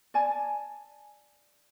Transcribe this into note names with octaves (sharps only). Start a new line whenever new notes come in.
D5 G#5 A5